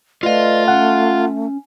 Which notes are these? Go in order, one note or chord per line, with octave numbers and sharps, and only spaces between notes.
A3 F4 B4 D5 D#5 F5
C#4 F#5